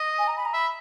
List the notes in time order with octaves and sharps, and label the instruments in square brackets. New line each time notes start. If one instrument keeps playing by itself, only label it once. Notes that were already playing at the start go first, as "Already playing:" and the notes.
Already playing: [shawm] D#5
[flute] G#5
A#5
B5
A#5
[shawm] E5 [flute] B5